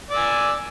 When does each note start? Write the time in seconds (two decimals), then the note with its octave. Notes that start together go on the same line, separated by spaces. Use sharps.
0.11 D5
0.14 E6
0.17 G#5